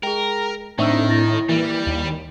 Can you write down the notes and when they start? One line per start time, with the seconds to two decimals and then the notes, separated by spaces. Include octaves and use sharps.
0.03 G#3 G#4 A#4 G5
0.78 A2 D#3 C4 D4 D#4 E5 C#6 E6
1.08 E4 A6 A#6
1.49 E3 G3 A#3
1.87 D#2